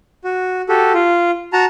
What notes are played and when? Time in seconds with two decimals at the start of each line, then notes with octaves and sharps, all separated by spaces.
0.24 F#4
0.69 F#4 G4 A4
0.94 F4
1.53 F#4 A5 A#5